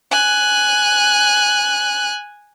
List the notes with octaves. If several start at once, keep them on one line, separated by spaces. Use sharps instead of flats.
G#5 F#6